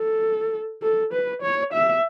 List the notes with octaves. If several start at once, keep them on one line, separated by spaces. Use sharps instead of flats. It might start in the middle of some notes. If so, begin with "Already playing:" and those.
Already playing: A4
A4
B4
C#5
E5